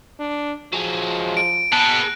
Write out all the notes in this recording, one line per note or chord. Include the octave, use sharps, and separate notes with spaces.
D4
F3 F#3 G#3
D7
B2 B3 G#4 A5 F#6